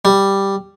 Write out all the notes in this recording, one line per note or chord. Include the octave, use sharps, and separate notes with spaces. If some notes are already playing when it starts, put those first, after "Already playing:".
G3